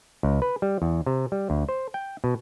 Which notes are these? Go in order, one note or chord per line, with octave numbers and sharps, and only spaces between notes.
C#2
B4
G3
E2
C3
G3
D2
C5
G5
B2